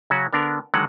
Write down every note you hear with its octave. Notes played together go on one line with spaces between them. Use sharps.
C#3 F#3 C#4 F#4
D3 B3 D4 A#4
D3 D#3 F#3 G#3 F#5